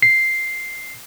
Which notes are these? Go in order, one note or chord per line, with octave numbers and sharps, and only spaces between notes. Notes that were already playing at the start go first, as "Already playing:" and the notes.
C7